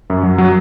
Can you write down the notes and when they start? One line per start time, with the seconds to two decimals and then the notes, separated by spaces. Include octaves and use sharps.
0.10 F#2
0.23 F#3
0.38 F#3